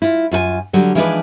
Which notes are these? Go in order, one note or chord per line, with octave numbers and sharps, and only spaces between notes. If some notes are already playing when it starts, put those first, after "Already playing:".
E4 F4
F#2 F4 A4 G#5
D3 F#3 G3
E3 F3 G#3 D4 D#4 B4